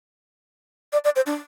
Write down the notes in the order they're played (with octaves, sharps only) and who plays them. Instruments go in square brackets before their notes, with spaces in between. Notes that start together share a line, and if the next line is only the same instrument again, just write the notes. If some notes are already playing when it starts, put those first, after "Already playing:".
[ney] D5
D5
C5
D4